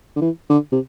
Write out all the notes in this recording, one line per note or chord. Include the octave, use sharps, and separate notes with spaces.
D3
E3
D3
C3